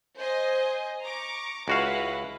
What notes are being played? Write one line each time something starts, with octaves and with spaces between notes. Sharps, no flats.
C5 D#5 G#5
A#5 C#6 D6
C#2 E4 F#4 B4 F5